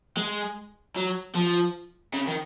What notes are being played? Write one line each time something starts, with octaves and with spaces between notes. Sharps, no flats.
G#3
F#3
F3
C#3
D#3